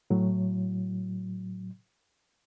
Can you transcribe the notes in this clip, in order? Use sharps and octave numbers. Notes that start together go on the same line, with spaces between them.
A2 F#3